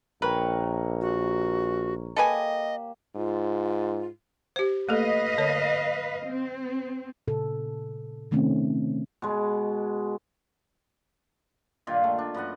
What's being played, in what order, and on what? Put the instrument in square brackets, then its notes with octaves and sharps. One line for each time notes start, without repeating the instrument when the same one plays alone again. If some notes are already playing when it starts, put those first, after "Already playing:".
[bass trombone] A#1 [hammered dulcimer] A#4 C#5 G5 [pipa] B4
[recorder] F#4
[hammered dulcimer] A#3 G4 [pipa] A4 B4 G#5 [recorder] D#5
[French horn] G#2 [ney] F4
[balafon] G4 C5
[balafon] A3 A#3 A4 [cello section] B4 D#5 F5
[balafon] D3 C#5
[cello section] C4
[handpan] A#2 C#3 A4
C3 D#3 A3 C4 C#4
[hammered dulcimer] B2 G#3
G2 A#2 D#3 F4
A3
D4
F#2 B4 D#5 F#5